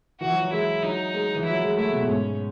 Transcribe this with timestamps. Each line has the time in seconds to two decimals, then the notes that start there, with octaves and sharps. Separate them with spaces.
0.20 E3 F#4
0.31 F#3
0.42 F#3
0.52 G#3 E4
0.83 F#3 D#4
1.14 G#3
1.35 E3
1.45 F#3 E4
1.62 G#3
1.76 A3 E4
1.92 B2
2.07 G#2 C#4